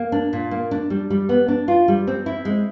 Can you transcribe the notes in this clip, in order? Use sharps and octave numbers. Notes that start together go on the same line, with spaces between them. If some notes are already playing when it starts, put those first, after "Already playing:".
Already playing: A#3
D4
A#2
A#3
D4
G3
G3
B3
D4
F4
G3
C4
E4
G#3